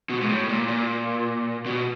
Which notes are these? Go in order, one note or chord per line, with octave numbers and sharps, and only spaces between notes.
B2
G#2
A2
A#2
A#2
B2